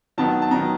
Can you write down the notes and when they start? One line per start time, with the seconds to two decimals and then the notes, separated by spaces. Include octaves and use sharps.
0.18 D#3 F#3 B3 A5
0.42 A5
0.51 D#3 F#3 B3 A#5